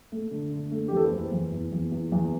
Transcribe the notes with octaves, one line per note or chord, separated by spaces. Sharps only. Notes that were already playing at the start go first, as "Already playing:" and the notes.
A3
D3
D3
A3
G4
E2
A4
B4
E2 C5
E2
E2
E2
E2
E2